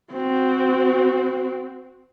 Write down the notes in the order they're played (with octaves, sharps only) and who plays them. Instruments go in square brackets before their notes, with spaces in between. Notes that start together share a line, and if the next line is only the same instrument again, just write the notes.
[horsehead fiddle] C4 F#4